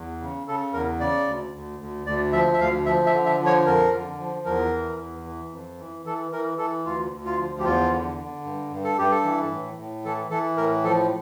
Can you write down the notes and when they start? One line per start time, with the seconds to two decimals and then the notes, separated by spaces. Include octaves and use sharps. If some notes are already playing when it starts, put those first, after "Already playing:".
Already playing: E2
0.21 C#3
0.47 C#3 A4
0.73 E2 A#4
1.00 C#3 D5
1.27 D2
1.54 D2
1.80 D2
2.06 D2 D5
2.33 F3 E5
2.54 E5
2.60 D2 F5
2.86 F3 E5
3.06 E5
3.13 D3
3.26 E5
3.40 F3
3.46 C#5
3.66 F2 A#4
3.93 D3
4.19 F3
4.46 E2 A#4
4.73 E3
4.99 E2
5.25 E3
5.52 F2
5.79 E3
6.06 E3 A4
6.31 E3 A#4
6.58 E3 A4
6.86 D2 F4
7.12 D2
7.25 F4
7.39 F3
7.59 G4
7.64 E2 F4
7.91 D3
8.18 D3
8.44 G2
8.72 G2
8.84 A4
8.98 G2 G4
9.11 A4
9.24 E3
9.51 A2
9.78 A2
10.05 E3 A4
10.31 E3 A4
10.57 A2 A#4
10.84 F3 A4